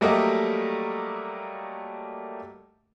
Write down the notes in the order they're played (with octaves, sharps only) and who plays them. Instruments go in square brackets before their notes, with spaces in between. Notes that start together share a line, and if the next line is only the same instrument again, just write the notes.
[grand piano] F#3 G3 A3 A#3 G4 D#5